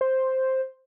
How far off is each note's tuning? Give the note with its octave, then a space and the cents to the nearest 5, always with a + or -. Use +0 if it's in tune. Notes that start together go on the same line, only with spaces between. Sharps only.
C5 +5